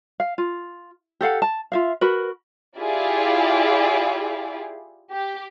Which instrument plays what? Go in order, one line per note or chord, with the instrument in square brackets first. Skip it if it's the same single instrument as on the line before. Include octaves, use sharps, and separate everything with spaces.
[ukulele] F5
F4
G4 A4 F5 F#5
A5
F4 E5 F5
F#4 A#4 B4
[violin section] E4 F4 G4 G#4 D5
G4